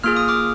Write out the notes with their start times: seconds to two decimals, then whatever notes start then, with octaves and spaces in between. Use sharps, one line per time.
0.04 A#3 F4 G#4 F6
0.17 D#6
0.28 D6 F6